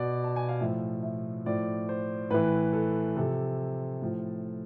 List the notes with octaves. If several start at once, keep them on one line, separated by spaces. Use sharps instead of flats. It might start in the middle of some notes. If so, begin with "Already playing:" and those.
Already playing: B2 D5
A5
G#5
F5
A2 F3 E5
E5
A2 F3 D5
C5
A2 E3 B4
A4
C3 F3 A4
A2 F3